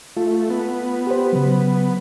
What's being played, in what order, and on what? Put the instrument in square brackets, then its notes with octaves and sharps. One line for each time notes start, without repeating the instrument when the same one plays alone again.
[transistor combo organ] A3 [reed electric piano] F4
[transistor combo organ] B3
[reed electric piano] G4 C5
C#3 F#3